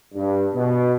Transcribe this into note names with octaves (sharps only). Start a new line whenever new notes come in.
G2
B2